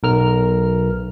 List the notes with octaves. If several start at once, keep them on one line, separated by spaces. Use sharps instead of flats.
B1 A#4 F6